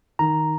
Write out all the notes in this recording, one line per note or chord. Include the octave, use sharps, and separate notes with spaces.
D#3 A#5